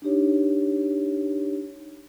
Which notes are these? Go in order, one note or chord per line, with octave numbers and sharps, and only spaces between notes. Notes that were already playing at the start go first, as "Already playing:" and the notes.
D4 D#4 G4 C#5